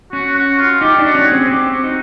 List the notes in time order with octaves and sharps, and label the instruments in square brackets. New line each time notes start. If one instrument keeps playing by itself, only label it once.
[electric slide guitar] C#4 [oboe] F#4
[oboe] F#4
F4
[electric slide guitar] D#4 [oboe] G4
[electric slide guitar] D4
[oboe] F#4
[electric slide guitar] C#4
[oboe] G#4
[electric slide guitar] C4
[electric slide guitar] C4 [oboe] G4
[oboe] F#4
[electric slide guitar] D#4